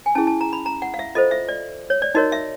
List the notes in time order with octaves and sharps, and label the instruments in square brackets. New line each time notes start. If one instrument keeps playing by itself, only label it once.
[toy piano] G#5
C#4 E4 G#4 A5
A5
A#5
B5
A#5
F#5
F5
E5
F4 A4 C5 D#5
E5
D5
C#5
D5
D#4 F#4 A#4 C#5 D#5
E5